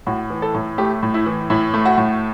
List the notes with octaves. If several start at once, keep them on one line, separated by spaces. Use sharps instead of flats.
A2 F#4
E3
A4
A2
A3 G4
A2
E4
E3
A2 E4
A3
F#4
A2